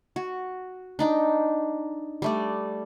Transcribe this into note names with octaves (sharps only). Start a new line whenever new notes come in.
F#4
D4 D#4 G5
G3 A3 D5